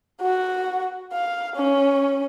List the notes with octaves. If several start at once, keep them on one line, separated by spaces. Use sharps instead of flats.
F#4
F5
C#4